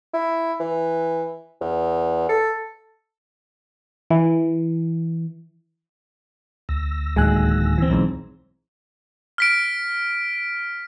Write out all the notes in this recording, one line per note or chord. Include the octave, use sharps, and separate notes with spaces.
E4
E3
E2
A4
E3
D2 E6 A#6
D1 D#2 G#3 G#5 F#6
E3 C4
B1 G#2
F6 B6 D7